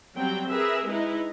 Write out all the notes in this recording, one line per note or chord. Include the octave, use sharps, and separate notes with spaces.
F#3 G3 C4 G5
G#4 A#4 B4 E5
G#3 D#4 E4 B4